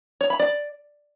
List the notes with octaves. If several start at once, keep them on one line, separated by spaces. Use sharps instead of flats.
C#5
B5
D5